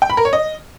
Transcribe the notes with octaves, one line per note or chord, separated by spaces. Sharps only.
G5
B5
A#4
C#5
D#5